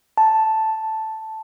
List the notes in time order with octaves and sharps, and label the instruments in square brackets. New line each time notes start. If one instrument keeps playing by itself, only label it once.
[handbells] A5